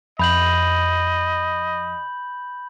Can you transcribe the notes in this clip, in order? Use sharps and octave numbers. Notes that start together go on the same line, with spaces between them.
F2 D#5 B5 G6 F#7